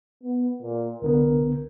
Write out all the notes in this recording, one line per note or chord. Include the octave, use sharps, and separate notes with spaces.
B3
A#2
C2 D3 B3 A#4